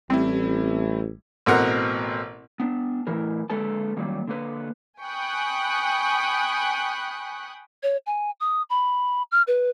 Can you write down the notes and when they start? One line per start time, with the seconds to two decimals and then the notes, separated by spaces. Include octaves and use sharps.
0.10 A1 G3 A3 C4 E4
1.46 A1 B2 C4 A#4 F#5
2.60 B3 D4
3.07 A2 E3 E4 A#4
3.50 D3 G#3 A#3 A4 B4 A5
3.97 D#3 F#3 G3 A#3
4.28 D3 A#3 B4
5.02 G5 G#5 B5 C#6 D#6 F#6
7.83 C#5
8.06 G#5
8.40 D#6
8.70 B5
9.31 F6
9.47 B4